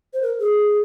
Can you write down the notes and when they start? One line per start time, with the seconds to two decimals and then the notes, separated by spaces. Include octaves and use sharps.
0.13 C5
0.22 A#4
0.39 G#4